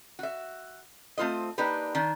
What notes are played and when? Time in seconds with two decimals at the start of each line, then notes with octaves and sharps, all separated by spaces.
0.19 F#4 E5
1.18 A3 C4 F4 C5 D#5
1.58 A#3 D4 D#4 G4 B4
1.95 D#3 D4